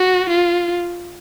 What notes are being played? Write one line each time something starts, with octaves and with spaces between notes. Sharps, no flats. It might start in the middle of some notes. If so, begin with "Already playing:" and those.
Already playing: F#4
F4